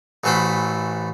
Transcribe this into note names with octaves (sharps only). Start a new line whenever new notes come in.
A1 E3 A3 F#4 C5 B5